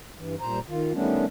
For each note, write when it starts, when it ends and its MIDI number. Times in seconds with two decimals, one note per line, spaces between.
0.18 0.35 43
0.18 0.35 52
0.40 0.59 43
0.40 0.59 46
0.40 0.59 72
0.40 0.59 82
0.68 0.93 51
0.68 0.93 65
0.94 1.26 51
0.94 1.26 55
0.94 1.26 57
0.94 1.26 59
0.94 1.26 61
0.94 1.26 62